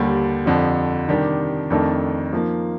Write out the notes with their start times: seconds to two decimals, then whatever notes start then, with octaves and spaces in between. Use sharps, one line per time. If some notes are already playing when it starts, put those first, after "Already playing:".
Already playing: D#2 D3 G3
0.46 F2 D3 F3
1.08 C3 D#3 G3 D4 G4
1.70 F2 D#3 A3 D4 A4
2.33 F3 A#3 D#4